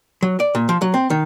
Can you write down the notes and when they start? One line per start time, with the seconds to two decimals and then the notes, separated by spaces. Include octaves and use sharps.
0.23 F#3
0.40 D5
0.55 A#2
0.69 F3
0.82 F#3
0.94 C4
1.10 D#3